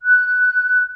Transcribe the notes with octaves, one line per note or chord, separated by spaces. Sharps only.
F#6